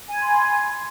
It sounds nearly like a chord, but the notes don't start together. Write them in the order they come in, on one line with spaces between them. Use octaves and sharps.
G#5 G#6 B5 C6